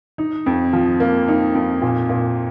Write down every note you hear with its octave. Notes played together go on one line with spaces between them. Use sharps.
D#4
F2
F3
A#3
D#4
F2
A#2
A#2